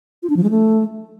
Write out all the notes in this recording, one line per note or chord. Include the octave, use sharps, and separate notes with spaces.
F4
D4
F3
G#3
A3